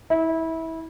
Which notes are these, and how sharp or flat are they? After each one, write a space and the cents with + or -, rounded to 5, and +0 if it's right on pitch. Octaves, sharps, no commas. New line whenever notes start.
E4 -25